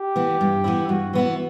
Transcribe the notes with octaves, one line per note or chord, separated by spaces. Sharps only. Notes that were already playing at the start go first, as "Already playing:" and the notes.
Already playing: G4
E3 B3 E4
G2
E3 B3 E4
G2 F#4
E3 B3 E4